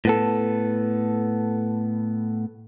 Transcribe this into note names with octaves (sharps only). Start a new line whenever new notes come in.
A2 B3 A4